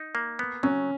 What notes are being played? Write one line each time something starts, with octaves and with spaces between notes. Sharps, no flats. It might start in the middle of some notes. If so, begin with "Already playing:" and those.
Already playing: D#4
A#3
B3
F#3 C#4